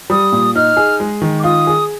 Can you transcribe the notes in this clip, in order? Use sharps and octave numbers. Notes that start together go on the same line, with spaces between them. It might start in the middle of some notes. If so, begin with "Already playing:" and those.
G3 D#6
A#2
D#4 F6
G#4
G#3
D#3
D6
F4 D#6
G#4